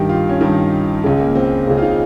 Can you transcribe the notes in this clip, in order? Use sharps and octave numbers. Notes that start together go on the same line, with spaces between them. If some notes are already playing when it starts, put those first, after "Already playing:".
Already playing: G2 D#3 G4
F4
C#4
G2 D#3 D#4
C#2 C#3
A#3
C4
C#2 C#3
F4
D#4